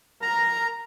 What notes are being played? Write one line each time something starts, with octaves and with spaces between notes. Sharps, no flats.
A#4 A#5